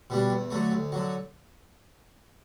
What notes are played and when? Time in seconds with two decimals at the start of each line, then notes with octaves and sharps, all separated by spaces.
0.10 B2 G3 D4
0.30 E2
0.51 D3 F#3 A3
0.71 D2
0.92 D3 F#3